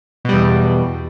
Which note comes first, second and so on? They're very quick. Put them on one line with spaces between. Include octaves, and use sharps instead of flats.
B2 G3 E2